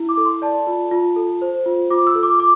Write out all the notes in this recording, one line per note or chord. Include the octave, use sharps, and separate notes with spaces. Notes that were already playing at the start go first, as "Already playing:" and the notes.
Already playing: E4
D6
A4
C6
D5 A5
F4
F4
A4
C5
F4
F4 D6
E6
A4
D6
D6